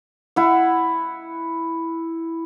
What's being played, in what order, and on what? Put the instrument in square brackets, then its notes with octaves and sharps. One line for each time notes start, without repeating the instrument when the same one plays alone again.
[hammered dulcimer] E4 F#5